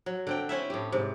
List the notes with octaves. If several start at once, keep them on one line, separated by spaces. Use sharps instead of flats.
F#3
D3 C4 G5
C4 C#4 E4 E5
A2 G4
G#2 C3